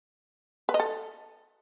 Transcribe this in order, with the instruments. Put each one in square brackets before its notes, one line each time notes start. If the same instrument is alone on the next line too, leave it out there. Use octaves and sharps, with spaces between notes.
[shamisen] B4
D#5
A4